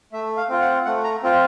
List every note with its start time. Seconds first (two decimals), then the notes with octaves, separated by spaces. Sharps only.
0.12 A3 E5
0.37 F5
0.49 C4 F4
0.61 F#5
0.85 A3 F#5
1.04 A#5
1.23 C4 F4